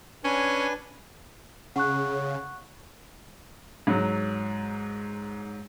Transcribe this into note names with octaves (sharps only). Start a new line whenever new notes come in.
C#4 D4 B4 G#5
C#3 F#5 C#6 F#6
G#2 F#3